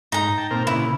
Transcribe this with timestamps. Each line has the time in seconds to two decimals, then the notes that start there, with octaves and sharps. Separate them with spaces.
0.12 G#2 D#4 A#5
0.38 G5 A5
0.51 A#2 C4 A#4
0.67 A#2 C#3 B3 E4